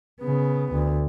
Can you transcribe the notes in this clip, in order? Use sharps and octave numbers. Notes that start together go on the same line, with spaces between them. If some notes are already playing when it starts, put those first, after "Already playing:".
C#3 B3
D2